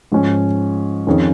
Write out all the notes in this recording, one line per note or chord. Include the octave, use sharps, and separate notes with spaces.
G#2 F3 C#4
F2 D#3 C#4 G#4